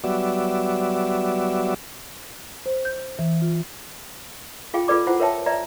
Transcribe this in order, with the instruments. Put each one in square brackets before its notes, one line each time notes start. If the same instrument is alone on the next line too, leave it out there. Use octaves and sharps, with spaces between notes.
[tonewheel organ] F#3 G3 B3 F#4 D5 E5
[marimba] C5
G6
E3
F4
[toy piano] F4 G#4 F5 G5
F4 G#4 A4 B4 D5 D6
E4 F4 C5 F#5
A#4 B4 C#5 E5 G5 A5
B4 D5 E5 A#5